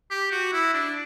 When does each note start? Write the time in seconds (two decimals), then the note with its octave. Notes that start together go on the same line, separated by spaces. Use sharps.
0.11 G4
0.31 F#4
0.53 E4
0.74 D4